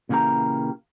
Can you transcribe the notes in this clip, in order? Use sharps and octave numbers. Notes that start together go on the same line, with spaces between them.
A#2 C#3 E3 A#3 G4 A#5